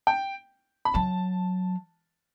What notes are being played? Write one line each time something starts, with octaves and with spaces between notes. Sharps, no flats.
G5
B5
F#3 A5